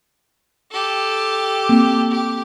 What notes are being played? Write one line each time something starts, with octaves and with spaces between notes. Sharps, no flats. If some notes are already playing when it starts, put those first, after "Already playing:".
G4 A4
A#3 C4
G4